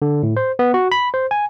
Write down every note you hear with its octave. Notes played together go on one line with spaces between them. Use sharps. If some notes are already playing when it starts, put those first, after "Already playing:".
D3
A2
C5
B3
F#4
B5
C5
G#5